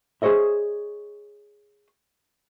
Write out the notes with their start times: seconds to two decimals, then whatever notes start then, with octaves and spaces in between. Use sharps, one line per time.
0.22 G#4 C5 C#5 D#5 E5